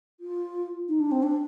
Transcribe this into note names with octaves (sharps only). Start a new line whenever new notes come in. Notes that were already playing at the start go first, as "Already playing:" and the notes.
F4
D#4
D4
C4
D4